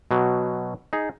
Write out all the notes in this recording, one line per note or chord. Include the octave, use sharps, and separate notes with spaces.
B2 F#3
D#4 G#4